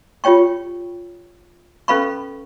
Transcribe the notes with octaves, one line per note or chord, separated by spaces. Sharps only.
F4 G4 C#5 G5 C#6
C#4 A4 B4 F5 B5 C#6